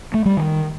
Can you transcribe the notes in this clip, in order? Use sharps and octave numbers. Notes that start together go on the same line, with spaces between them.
A3
G3
D#3